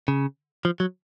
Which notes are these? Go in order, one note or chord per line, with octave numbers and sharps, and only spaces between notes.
C#3
F3
F#3